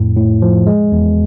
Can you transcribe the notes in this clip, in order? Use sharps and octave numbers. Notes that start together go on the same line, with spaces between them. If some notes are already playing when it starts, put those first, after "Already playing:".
Already playing: F2 A2
A2
F3
G#3
E2